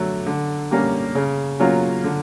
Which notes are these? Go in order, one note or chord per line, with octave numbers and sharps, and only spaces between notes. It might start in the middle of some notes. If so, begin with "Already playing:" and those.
Already playing: D3 F#3 A3
D3
G3 A#3 C#4
C#3
F#3 A#3 C#4 F4
D3